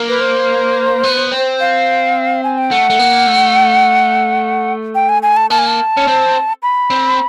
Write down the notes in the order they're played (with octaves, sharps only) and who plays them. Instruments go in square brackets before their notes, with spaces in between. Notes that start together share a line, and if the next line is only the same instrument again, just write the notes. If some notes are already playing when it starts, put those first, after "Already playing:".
Already playing: [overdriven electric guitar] A#3
[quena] B4
C5
[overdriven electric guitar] B3
C4
[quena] F5
G#5
G5
[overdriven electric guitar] A3 [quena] F#5
[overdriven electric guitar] A3
A#3
A3
[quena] G5
G#5
G#5
A5
[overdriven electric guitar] A#3 [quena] A5
[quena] G#5
A5
[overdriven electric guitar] C#4
C4
[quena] B5
[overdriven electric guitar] C4